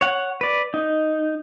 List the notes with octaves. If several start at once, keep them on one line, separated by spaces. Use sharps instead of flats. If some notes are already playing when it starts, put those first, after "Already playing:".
C#5 F#5
B4 D5
D#4